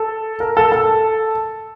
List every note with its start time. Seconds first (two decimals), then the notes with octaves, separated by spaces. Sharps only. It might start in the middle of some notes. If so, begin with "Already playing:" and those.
Already playing: A4
0.40 A#4
0.57 A4
0.72 A4